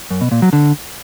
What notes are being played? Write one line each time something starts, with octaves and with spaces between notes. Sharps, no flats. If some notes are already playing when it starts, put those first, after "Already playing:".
F#2
B2
A#2
F#3
D3